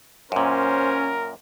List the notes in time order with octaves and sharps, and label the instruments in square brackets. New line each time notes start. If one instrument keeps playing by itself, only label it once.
[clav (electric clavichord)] F#2 A#2 [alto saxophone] C#4 [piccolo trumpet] A#4 [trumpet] C5